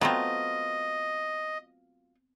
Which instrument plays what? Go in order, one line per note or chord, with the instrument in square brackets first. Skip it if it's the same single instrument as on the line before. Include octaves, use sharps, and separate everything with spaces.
[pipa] F#3 A3 F4 [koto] B3 C4 [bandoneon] D#5